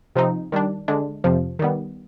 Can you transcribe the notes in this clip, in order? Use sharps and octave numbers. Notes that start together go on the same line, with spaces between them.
C3 F3 C4 D#4
D#3 G3 D4
D3 G#3 D4
F2 C3 F3
D#3 G3 B3